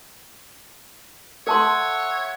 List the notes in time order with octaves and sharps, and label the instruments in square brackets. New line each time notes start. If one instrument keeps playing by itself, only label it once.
[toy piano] A4 A5 C6 [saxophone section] C#5 E5 F#5